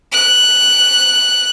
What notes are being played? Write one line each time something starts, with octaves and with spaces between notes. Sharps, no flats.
F#6